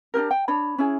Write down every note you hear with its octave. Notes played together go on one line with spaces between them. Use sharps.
D4 D#4 G4 A#4
G5
D4 C#5 B5
C#4 E4 G#4